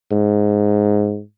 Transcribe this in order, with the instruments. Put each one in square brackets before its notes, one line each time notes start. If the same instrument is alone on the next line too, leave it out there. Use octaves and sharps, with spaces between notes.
[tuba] G#2